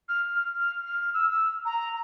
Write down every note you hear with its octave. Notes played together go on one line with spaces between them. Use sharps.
F6
F6
F6
F6
E6
E6
A#5